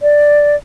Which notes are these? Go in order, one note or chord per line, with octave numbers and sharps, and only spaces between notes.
D5